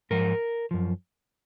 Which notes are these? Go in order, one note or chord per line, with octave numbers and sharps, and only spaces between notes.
G#2 F3 A#4
F#2 F3